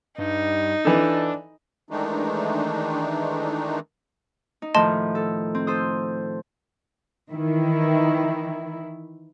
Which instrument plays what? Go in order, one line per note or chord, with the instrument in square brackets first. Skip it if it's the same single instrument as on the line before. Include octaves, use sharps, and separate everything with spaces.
[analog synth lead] G2 [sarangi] D#4
[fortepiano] E3 A4 [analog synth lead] D4
[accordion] D#3 E3 G#3 A3 D4 D#4
[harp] D#4
[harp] A2 D#3 F3 [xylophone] D#5 A5 C6
[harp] A4
C4
A4 C5 D#6
[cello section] D#3 E3 E4